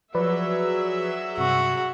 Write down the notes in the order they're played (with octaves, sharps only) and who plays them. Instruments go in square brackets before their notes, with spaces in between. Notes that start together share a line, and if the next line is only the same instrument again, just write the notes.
[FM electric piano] F3 B4 D5 [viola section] F#3 G#4 E5
[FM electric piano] G2 C3 C#6 [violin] F#4